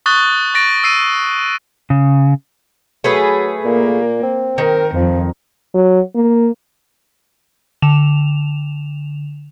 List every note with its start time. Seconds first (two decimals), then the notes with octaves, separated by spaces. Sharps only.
0.06 C#6 D#6 F#6 A6 G7
0.54 C#6 A6 A#6 D7
0.84 E6 C7 D#7
1.90 C#3
3.04 F#3 A3 G#4 B4
3.65 A#2 A#3
4.23 C4
4.58 D#3 A#4
4.95 F2 F3
5.75 F#3
6.15 A#3
7.82 D3 E7 F7